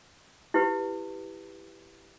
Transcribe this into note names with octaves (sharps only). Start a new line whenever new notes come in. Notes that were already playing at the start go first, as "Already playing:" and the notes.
E4 G4 B4